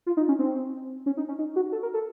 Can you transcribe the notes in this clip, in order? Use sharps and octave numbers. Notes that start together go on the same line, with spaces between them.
F4
D#4
C#4
C4
C#4
D#4
C#4
D#4
F#4
A4
A#4
A4